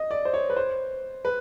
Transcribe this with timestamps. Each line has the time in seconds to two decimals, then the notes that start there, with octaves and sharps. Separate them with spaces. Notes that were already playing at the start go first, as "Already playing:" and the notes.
Already playing: D#5
0.11 D5
0.25 C5
0.33 C#5
0.50 B4
0.57 C5
1.25 B4